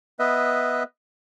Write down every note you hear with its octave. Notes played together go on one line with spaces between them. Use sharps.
B3 B4 D#5 E5